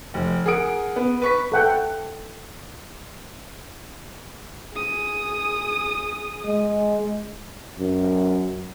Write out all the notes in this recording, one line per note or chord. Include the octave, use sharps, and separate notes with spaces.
F1
G#4 A#4 F#5 D#6 D7
B3
B4 C#6 B6
A4 F#5 G5
G#4 D#6
G#3
F#2